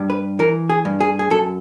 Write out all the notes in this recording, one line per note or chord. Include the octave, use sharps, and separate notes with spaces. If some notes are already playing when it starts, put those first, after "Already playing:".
Already playing: G2
B4
E3 A#4
G#4
G2
G#4
G#4
F#2 A4